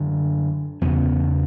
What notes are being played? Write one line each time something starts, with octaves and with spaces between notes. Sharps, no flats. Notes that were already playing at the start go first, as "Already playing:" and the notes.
Already playing: F#2 D3
E2 C#3 B3